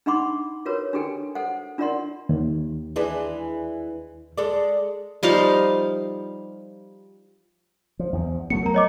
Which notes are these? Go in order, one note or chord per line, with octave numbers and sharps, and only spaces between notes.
D4 D#4 F#5 B5 C6 D6
F4 F#4 A#4 B4 C#5
D4 F#4 G4 A4 G5 G#5
A4 C5 F#5
D4 F4 A#4 D5 F#5 C6
D#2
E3 G#3 D4
G#3 A4 D5
F3 G3 D#4 F5
F3
E2 F3
F#3 A3 B3 C#7
A#4 A#5
C#5 D#5 D6